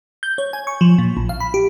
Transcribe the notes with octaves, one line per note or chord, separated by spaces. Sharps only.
G6
C#5
G#5
C#6
F3
A#2
A#1
F5
B5
G4